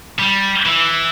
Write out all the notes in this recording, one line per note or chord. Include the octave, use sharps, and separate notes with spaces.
G3
E3